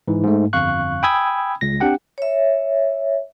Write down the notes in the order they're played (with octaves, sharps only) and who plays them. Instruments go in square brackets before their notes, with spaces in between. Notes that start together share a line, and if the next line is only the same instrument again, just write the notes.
[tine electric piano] G#2 E3
G#2 A3
G1 F2 F5 C#6 F#6
G5 G#5 B5 D#6 E6 G#6
C#2 A#6
C4 D4 G4 F#5 G5
[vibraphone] C#5 E5